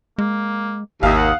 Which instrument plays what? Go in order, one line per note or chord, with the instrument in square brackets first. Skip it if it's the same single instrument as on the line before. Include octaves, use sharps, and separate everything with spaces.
[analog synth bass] G#3 [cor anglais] A#3
[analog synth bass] G#1 [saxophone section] D#2 [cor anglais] E5 [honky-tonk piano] F5 D#6
[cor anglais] F#5